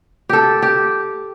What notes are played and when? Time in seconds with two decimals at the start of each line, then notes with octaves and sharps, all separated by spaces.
0.29 G4 A4
0.62 G4